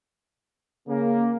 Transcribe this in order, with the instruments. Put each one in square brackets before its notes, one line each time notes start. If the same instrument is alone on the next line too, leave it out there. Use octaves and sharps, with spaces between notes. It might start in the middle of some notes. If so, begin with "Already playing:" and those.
[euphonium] C#3 [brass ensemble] A#3